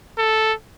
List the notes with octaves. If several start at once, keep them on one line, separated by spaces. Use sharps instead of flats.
A4